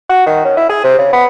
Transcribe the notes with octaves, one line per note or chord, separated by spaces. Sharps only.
F#4
D#3
C#4
E4
G#4
C3
C#3
B3